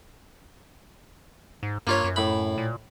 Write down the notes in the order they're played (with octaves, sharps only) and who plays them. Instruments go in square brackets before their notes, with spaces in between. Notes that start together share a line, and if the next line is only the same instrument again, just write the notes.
[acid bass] G#2
[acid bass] G2 [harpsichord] A#3 F4 C#5
[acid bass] F#2
[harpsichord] A2 B5
[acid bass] A#2